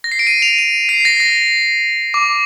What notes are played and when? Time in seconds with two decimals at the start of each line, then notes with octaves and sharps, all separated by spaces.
0.04 A#6
0.12 C7
0.19 D7
0.27 D#7
0.42 F7
0.59 D#7
0.89 C7
1.05 A#6
1.20 A#6
2.14 D6